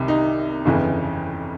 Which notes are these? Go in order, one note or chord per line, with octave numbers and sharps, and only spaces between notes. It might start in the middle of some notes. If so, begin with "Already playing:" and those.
Already playing: C2 C3 D#3
D#4
G1 F2 C#3 E3